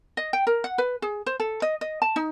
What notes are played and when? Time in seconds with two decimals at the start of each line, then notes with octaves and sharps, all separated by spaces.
0.17 D#5
0.33 G5
0.47 A#4
0.64 F#5
0.78 B4
1.02 G#4
1.26 C5
1.40 A4
1.62 D#5
1.81 D#5
2.02 A5
2.16 D#4